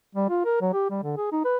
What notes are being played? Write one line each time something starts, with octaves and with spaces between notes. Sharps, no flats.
G3
F4
A#4
F#3
G4
G3
D3
G#4
D#4
B4